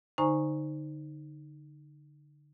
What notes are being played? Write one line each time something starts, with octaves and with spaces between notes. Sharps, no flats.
D3 D#4 C5 G#5 A#5 C#6